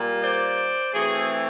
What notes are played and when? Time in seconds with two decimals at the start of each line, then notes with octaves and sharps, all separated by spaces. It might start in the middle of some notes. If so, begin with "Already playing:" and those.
Already playing: A#2 G3 A#3
0.22 C5 D5
0.93 E3 A3 C4 F#4 G#4